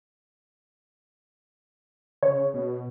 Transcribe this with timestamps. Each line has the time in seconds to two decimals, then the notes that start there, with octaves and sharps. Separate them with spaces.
2.23 C#3 C#5
2.54 B2